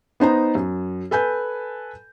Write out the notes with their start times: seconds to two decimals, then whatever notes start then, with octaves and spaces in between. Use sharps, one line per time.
0.20 B3 D#4 C5 A#5
0.55 F#2
1.11 A4 B4 G#5 G6